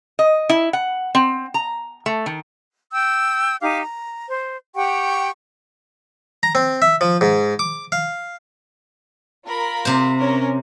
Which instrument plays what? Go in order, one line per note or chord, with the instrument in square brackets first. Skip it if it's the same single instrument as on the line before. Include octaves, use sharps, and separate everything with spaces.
[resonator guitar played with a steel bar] D#5
E4
F#5
C4
A#5
A3
D#3
[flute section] G5 E6 G6
D#4 G4 F5 D6
A#5
C5
G4 F#5 G5 C#6
[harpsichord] A#5
C4
E5
F3
G#2
D6
F5
[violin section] F4 A#4 B5
[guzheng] C3 C5
[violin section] C#4 A#4